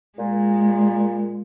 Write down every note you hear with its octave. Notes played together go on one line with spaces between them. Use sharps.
A#2 G#3